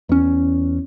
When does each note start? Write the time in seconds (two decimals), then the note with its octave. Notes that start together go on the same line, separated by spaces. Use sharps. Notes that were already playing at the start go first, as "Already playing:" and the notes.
0.09 E2 C#4